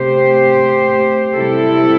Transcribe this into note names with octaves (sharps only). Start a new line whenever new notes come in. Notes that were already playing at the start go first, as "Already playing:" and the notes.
Already playing: C3 A3 G4 C5
C3 G3 E4 A4